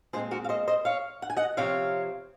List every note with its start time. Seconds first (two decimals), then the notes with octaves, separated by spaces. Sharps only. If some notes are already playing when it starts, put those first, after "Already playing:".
0.13 A#2 G#3 C4 G#4 C5
0.31 F#4 A#4
0.44 F5
0.49 C5 D#5
0.68 C5 D#5
0.85 C#5 F5
1.22 F#5
1.30 G#5
1.37 D#5 F#5
1.57 C3 F3 C4 C#5 F5